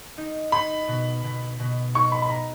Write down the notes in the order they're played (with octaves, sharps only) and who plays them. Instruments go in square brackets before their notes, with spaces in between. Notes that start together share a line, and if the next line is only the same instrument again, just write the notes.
[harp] D#4
[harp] D#4 [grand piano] B5
[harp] B2
B2
B2
[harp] D#4 [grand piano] C#6
[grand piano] B5
B5
A#5